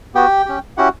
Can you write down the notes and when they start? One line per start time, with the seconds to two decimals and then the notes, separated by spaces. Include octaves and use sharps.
0.15 B3 F#4 G4 G5
0.46 C#4 G4
0.77 C#4 E4 F#4 G4 F#5